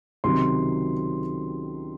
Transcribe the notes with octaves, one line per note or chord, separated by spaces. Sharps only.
C#2 C3 D#3 F#3 C6